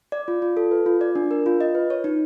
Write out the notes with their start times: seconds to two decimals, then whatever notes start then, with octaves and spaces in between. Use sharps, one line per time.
0.12 D5
0.28 F4
0.42 F4
0.57 A4
0.71 B4
0.86 F4
1.01 D5
1.15 D4
1.31 A#4
1.46 F4
1.61 D#5
1.75 B4
1.90 C#5
2.04 D#4